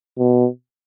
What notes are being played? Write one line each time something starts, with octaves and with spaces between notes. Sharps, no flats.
B2